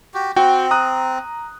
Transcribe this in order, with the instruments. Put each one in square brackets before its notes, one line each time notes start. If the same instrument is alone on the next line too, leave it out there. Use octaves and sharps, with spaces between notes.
[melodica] F#4 G4
[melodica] C4 [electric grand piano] F#4 G5
[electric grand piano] A#5 D#6 F#6